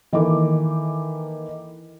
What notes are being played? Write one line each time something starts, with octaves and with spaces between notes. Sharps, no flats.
D#3 E3 A#3 A4 D6